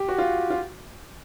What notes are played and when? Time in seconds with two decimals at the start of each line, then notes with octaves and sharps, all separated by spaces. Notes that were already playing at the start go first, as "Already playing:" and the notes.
Already playing: G4
0.09 F#4
0.18 F4
0.50 F4